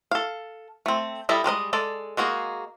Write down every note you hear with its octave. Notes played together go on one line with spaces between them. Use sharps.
A4 F5
A3 C4
G3 E4 A4 D#5 E5
G3 G#3 A#4 D#5
G#3 A4 D5
G#3 A#3 F#4 G#4